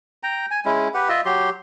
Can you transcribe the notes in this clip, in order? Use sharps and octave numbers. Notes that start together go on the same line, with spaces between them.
G5 A#5
G#5
G#3 C#4 E4
G4 B4 F#5
F4 D#5 E5
F#3 G4 C6